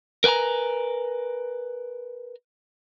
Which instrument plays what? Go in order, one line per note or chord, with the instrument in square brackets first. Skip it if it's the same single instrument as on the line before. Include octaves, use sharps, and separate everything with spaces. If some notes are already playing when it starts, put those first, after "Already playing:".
[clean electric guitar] A#4 B4 G5 G#5 A#5